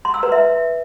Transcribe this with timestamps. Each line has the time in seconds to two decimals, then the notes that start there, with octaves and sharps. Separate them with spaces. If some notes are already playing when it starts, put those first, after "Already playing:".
0.05 C6
0.14 E6
0.23 B4
0.32 E5